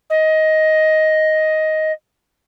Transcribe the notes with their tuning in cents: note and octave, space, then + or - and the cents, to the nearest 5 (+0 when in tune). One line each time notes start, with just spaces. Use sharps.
D#5 +10